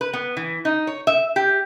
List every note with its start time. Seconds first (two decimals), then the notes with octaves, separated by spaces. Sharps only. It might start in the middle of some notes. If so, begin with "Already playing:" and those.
0.01 B4
0.13 B3
0.37 E3
0.65 D#4
0.87 C#5
1.07 E5
1.36 G4